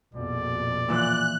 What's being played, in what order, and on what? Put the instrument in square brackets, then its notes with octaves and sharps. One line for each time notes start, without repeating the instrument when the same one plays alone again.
[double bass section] A#1 F2 B2 [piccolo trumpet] D5
[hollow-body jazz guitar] A#2 E3 F3 [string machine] F#6